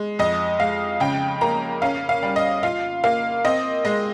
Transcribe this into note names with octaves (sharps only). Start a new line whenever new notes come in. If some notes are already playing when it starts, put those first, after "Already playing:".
Already playing: G#3
F2 D#5
G#3 F5
C#3 G5
A#3 A#5
C#4 F5
F5
G3
D#5
F4 F5
A#3 F5
C4 D#5
G#3 D#5